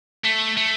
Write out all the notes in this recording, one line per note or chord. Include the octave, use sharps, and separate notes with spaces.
A3
A3